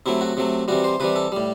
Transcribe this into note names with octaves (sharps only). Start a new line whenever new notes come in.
C3 F#3 A3 E4
F#4
C3 F#3 A3
C3 E3 G3 F#4
C5
C3 E3 G3 B4
A4
A2 G3